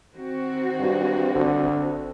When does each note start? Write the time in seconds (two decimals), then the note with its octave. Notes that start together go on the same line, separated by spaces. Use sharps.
0.14 D#3 C4 F#4
0.79 G2
1.35 G#1 D3
1.66 G1